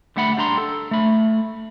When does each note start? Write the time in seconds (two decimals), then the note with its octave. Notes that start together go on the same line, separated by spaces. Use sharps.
0.16 D3 G3 A3 F#5 A5 B5
0.37 G3 D4 A#5 C6
0.58 A4
0.91 A3 B5